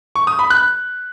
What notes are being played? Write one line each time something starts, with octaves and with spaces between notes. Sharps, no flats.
C#6
D#6
B5
F#6